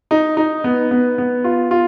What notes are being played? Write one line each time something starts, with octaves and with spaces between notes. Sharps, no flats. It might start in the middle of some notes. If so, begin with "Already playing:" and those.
D#4
D#4
B3
B3
B3
F4
F4